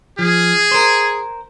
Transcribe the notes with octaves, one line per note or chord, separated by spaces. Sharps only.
F3 G#4
A#4 C5